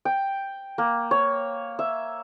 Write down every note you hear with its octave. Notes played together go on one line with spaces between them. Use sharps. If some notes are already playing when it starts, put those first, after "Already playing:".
G5
A#3
C#5
E5